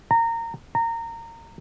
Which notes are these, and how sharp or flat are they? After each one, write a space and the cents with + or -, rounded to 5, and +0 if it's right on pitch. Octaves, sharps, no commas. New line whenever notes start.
A#5 -20
A#5 -20